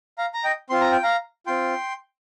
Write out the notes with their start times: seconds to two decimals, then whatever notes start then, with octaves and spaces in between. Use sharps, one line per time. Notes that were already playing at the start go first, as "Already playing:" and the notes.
0.18 F5 A#5
0.34 A#5
0.44 D#5 G5
0.70 C4 F4 C6
0.81 A#5
0.92 G5
1.03 F5 A#5
1.46 C4 F4 G5 C6